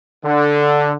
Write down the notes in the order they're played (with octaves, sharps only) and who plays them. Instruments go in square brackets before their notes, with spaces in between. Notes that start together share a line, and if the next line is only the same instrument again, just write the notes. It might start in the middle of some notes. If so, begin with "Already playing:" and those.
[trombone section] D3